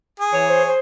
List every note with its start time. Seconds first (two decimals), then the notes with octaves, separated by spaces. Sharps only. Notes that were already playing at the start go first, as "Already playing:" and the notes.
0.20 G#4
0.33 E3 C#5
0.49 C5
0.67 C5